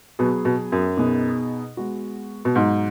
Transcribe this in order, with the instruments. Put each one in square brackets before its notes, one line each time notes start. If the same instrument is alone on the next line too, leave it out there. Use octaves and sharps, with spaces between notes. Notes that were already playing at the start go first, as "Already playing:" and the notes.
[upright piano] B2 [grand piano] F#3 B3 G#4
[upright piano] B2
F#2
[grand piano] B2 B3 D#4 G#4
G#3 B3 F#4
[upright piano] B2
[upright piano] G#2 [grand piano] B2 F#3 D#4 F#4